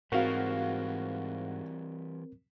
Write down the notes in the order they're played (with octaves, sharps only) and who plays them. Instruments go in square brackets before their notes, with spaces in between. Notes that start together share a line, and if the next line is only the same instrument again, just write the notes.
[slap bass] G#2 [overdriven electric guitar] E3 G3 [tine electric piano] C4 A#4 [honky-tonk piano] F#4 F5